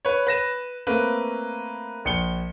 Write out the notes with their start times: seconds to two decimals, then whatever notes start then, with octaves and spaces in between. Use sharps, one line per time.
0.05 B4 C#5
0.27 B4 A#6 E7
0.87 A3 A#3 C4 B4
2.05 A#1 C#7 G7